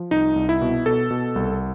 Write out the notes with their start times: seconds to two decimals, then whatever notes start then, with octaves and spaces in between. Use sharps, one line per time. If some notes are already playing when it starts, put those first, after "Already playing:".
Already playing: F3
0.11 C2 D#4
0.36 C2
0.49 E4
0.62 B2
0.86 B2 A4
1.10 B2
1.36 C2